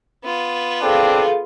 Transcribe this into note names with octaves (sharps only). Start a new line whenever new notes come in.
B3 F4
C4 D4 G#4 A4 F5